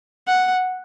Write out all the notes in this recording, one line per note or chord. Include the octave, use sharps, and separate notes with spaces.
F#5